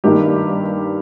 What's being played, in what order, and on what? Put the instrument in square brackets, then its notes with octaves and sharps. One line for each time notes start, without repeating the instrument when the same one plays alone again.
[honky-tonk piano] G2 D#3 A#3 G4